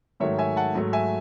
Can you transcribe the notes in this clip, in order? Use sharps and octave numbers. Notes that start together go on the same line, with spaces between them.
G#2 D#3 F#3 A3 C#5 E5
E5 G#5
F#5 A5
G#2 F#3 A3
E5 G#5